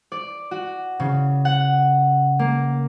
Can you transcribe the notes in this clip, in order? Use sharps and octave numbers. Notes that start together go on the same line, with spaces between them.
D5
F#4
C#3
F#5
A#3